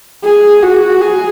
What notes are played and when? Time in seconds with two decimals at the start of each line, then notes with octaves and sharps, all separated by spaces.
0.25 G#4
0.63 F#4
1.01 G#4